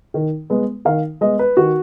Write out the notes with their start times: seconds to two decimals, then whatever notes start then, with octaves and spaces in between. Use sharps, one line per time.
0.14 D#3
0.50 G#3 B3
0.85 D#3 F5
1.21 G#3 B3 D#5
1.39 B4
1.57 D#3 F#4